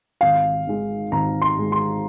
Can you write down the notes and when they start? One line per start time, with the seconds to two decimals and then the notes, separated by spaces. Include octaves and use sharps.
0.21 G#1 F5
0.67 G#2 D#3 G#3 D#4
1.12 G#1 A#5
1.42 C6
1.56 G#2 D#3 G#3 D#4
1.72 C6